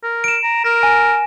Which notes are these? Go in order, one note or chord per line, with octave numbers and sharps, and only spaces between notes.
A#4
D7 E7
A#5
A#4 A#6
G#5